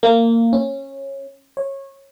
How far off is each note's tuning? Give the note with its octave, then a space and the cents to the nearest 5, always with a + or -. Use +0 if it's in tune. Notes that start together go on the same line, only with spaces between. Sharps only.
A#3 -20
C#4 -20
C#5 -20